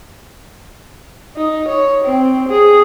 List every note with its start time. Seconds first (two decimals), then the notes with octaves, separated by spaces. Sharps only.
1.36 D#4
1.68 C#5
2.05 C4
2.49 G#4